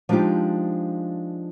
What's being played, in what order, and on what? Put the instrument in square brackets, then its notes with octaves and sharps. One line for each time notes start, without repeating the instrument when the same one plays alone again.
[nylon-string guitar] F3 G#3 D4 D#4 F4 G4